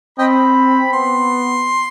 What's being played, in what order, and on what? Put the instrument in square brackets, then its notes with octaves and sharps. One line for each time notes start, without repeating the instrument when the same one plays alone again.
[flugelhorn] C4 [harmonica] D#5 G5 B5
[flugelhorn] B3 [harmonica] C6